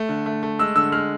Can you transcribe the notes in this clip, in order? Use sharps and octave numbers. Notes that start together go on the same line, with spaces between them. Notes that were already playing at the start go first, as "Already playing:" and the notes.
Already playing: A3
D3
A3
A3
G#3 E6
D3 E6
G#3 F6